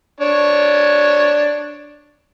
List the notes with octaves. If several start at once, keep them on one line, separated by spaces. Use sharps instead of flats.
D4 C#5